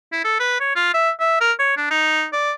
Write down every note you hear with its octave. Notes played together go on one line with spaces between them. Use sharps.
E4
A4
B4
C#5
F4
E5
E5
A#4
C#5
D4
D#4
D5